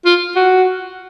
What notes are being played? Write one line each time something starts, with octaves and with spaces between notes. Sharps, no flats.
F4
F#4